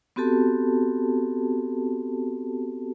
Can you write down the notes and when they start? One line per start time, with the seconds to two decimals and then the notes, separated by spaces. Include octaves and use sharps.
0.16 B3 C4 F#4 G4 A4 A5